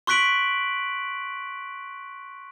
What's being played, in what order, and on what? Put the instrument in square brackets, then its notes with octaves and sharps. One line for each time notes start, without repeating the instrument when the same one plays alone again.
[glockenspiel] C6 C#6 F#6 B6 D7 F#7